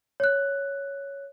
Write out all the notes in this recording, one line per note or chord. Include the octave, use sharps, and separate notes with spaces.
C#5 F#6